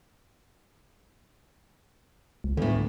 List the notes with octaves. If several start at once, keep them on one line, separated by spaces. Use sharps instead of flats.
C#2
E2 A2 D3